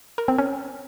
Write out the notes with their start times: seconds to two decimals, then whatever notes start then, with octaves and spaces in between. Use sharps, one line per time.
0.18 A#4
0.28 C4
0.38 C#4